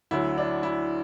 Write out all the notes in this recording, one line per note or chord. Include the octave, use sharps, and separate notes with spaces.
D2 D3 F#3 E4
D4
E4